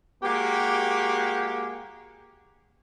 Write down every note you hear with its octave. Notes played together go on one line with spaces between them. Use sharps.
G#3 A#3 F#4 G4